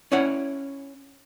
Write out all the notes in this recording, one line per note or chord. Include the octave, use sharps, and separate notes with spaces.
C#4 E4 C#5 D5 F#5